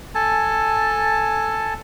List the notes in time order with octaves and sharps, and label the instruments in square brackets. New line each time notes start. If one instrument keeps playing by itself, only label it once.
[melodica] A4 G#5 A5